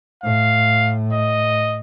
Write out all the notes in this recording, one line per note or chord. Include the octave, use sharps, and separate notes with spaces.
A2 F5
D#5